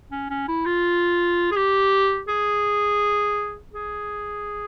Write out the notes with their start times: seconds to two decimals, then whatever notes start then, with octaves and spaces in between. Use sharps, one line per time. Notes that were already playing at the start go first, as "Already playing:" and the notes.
0.12 C#4
0.30 C#4
0.48 E4
0.66 F4
1.52 G#4
1.56 G4
2.28 G#4
3.73 G#4